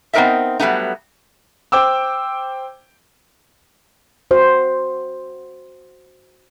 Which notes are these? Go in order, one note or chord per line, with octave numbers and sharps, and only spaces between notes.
B3 C4 D#4 A#4 D#5 E5
F#3 G3 A3 B3 D#4
C5 G5 D6 E6
F#4 C5